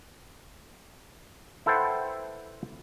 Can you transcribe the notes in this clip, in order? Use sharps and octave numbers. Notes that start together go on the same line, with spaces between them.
E4 A4 B4 C5 F#5 G5